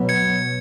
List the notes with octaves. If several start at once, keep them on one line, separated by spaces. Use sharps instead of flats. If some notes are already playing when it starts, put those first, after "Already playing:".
Already playing: B2 F#3 B3
G#6 C#7